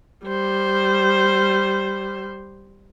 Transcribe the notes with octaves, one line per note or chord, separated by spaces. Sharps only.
G3 C5